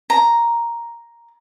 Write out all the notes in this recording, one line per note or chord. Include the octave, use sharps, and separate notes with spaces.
A#5